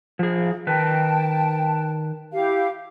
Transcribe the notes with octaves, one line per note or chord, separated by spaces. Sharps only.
F3 G#4
D#3 B4 G5 A5
E4 G4 F5